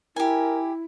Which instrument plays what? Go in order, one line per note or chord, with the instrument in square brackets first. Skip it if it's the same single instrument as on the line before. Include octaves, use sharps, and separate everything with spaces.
[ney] E4 [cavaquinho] G4 G#5 [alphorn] A#4